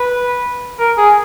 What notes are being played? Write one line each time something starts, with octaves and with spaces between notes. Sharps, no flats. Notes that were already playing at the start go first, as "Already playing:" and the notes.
Already playing: B4
A#4
G#4